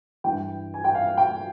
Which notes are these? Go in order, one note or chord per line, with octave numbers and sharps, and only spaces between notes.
G2 E3 G5
G#5
G5
F5
G5